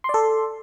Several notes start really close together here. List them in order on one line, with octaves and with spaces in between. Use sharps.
C6 D5 A4